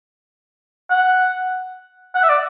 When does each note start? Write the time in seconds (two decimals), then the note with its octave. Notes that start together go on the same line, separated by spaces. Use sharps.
0.91 F#5
2.15 F#5
2.23 E5
2.29 D5